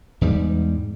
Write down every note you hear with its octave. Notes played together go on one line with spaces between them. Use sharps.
E2 G#2 G3 G#3